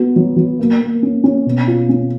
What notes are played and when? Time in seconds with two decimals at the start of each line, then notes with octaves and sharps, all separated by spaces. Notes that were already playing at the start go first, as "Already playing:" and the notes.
Already playing: B3 F#4
0.16 F#3
0.36 F#3
0.59 A#3
0.81 A#3
1.03 C#4
1.24 C#4
1.46 B2
1.67 F4
1.89 C#4